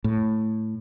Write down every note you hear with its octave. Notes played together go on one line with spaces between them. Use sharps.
A2